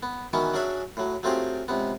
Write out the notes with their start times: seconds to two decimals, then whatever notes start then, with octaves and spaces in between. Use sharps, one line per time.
0.03 B3
0.33 D#3 E3 F#3 B3 C#4
0.54 F#3 C#4 D4 G#4 E5
0.97 A2 F#3
1.23 F#3 A3 C4 F4 G4 G#4
1.68 C#2 C3 B3